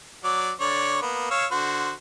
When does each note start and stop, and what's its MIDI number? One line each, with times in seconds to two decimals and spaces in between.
0.24 0.51 54
0.24 0.51 74
0.24 0.51 86
0.61 0.99 50
0.61 0.99 73
0.61 0.99 74
1.02 1.30 58
1.02 1.30 59
1.31 1.46 73
1.31 1.46 77
1.31 1.46 88
1.52 1.92 50
1.52 1.92 66
1.52 1.92 72